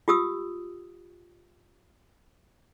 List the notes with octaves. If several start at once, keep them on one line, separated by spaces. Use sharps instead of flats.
F4 G4 D#6 E6